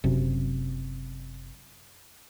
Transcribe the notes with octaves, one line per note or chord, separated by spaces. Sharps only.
F#1 F#2 C3